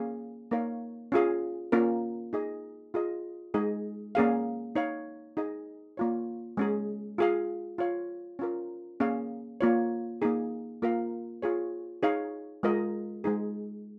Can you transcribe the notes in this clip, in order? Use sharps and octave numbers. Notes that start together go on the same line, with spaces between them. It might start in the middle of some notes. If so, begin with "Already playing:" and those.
Already playing: A#3 C#4 G#4 F5
A#3 D#4 A#4 C#5 F5
C#4 F4 G#4 F5
A#3 C#4 F4 A#4
D#4 G#4 D#5
F4 G#4 D#5
G#3 D#4 G#4 D#5
A#3 C#4 G#4 F5
D#4 C#5 F5
D#4 G#4 D#5
A#3 F4 C#5
G#3 C#4 G#4
F4 G#4 F5
F4 C#5 F5
C#4 F4 A#4
A#3 C#4 G#4 F5
A#3 F4 C#5
A#3 D#4 G#4
A#3 F4 A#4 F5
F4 G#4 C#5
D#4 G#4 C#5 F5
G#3 F4 A#4 D#5
G#3 D#4 G#4